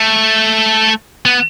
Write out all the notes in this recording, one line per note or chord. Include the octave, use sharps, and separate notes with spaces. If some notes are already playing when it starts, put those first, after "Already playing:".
Already playing: A3
B3